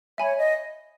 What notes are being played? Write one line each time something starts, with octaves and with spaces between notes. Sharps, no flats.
C#5 E5 G#5 B5
D#5